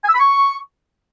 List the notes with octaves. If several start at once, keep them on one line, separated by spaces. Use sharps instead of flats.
G#5
E6
B5
C#6